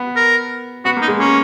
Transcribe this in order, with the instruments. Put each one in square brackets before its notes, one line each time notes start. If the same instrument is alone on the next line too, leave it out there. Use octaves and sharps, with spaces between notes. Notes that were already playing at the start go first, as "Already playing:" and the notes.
Already playing: [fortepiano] B3
[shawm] A#4
[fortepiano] B3 [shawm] F#4
[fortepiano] A#3
[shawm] D#4
[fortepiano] G#3
[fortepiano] A#3 [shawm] C#4